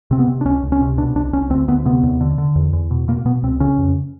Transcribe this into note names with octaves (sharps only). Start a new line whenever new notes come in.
C3 C4
B3
C3
D4
C#2 C#4
C#2
C#4
C3
B2 D4
C2 D4
C2 C#4
D2 C4
D2 B3
C3 B3
D#2
D3
D3
E2
E2
B2
B2 A#3
B2 B3
C#2 C4
C#3 C#4
F2